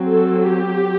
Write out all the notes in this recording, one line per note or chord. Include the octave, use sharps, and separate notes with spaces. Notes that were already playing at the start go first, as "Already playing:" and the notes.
Already playing: F#3 C4
A4
G4